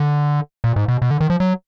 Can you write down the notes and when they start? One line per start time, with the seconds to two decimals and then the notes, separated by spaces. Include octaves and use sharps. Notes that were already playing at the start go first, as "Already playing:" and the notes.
Already playing: D3
0.64 A#2
0.76 G#2
0.88 B2
1.02 B2
1.11 D3
1.21 D#3
1.30 F3
1.40 F#3